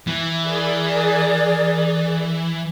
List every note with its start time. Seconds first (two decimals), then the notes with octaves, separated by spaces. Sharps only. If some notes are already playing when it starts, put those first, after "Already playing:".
0.08 E3
0.44 G#4 A#4 D5